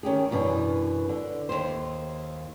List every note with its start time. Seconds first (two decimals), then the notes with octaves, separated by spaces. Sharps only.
0.03 D#3 C#4 G4 G#4
0.31 F#2 B2 E3 D4
1.09 D3
1.49 D#2 C5